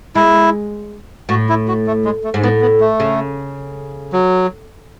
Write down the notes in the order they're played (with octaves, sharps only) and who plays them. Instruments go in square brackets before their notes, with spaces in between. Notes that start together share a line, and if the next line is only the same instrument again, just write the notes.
[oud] G#3 [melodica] E4
[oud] A2 [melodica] F#4
[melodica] E4
F#4
A3
G#3
A3
[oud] G#2
[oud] A2 [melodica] B3
[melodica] B3
A3
[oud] C#3
[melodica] F#3